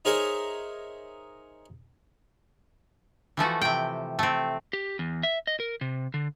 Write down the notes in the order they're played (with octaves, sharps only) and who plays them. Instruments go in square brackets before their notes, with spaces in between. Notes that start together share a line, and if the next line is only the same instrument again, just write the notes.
[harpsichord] D#4 G#4 A#4 C5 C#5 E5
[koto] E3 F3 A3 F#4
C3 G5
A3 C4
[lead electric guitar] G4
E2
E5
D#5
A#4
C3
D3